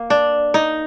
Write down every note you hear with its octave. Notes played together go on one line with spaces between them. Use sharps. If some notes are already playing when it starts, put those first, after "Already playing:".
Already playing: A#3
D4
D#4